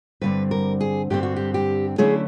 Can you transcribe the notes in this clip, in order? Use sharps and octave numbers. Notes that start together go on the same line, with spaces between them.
G2 D3 G3 C4 B4
A#4
G#4
G2 D3 G3 C4 G4
F#4
G4
G4
D3 F#3 A3 C#4 E4 G#4